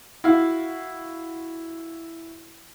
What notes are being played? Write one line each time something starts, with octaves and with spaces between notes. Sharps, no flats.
E4 F#4 F5